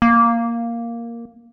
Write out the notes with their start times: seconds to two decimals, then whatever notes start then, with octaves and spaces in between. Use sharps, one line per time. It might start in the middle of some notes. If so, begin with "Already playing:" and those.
0.02 A#3